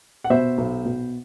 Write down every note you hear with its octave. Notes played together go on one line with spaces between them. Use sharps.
F#5
B2 C5 E5
B1
B2